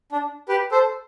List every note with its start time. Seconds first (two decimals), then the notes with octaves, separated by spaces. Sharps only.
0.12 D4
0.49 G4 B4
0.72 A4 C5